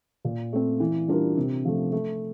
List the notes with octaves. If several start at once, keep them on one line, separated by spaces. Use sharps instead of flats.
A#2
A3 C4
E3
G3 D4 F4 A#4
C3
F3 A3
A3